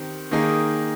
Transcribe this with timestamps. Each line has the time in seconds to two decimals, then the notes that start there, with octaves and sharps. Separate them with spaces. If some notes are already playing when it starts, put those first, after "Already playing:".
Already playing: D#3 C4 G4
0.31 D#3 A#3 D#4 G#4